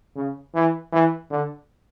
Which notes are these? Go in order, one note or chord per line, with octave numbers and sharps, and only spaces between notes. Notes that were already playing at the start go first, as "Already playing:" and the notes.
C#3
E3
E3
D3